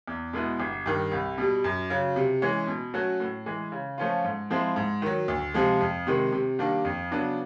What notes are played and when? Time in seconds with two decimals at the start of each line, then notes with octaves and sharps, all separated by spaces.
0.07 E2
0.33 B2 G#3 B3 E4
0.60 G1
0.86 G2 D#3
1.12 C2
1.38 B2 G3
1.64 F#2
1.90 C#3 F#3
2.16 C3
2.42 E3 G#3 C#4
2.67 B2
2.94 F#3 A3 C#4 F#4
3.20 A2
3.46 E3 G#3
3.72 C#3
3.98 F3 A3 C#4 F4
4.25 G#2
4.50 F3 G#3 C4 E4
4.76 G#2
5.02 D#3 F#3
5.28 D2
5.54 C3 F3 G#3
5.81 F2
6.07 C3 D#3 G#3
6.32 C3
6.59 D#3 G3 A#3 D4
6.85 F2
7.11 C#3 F#3 B3 D4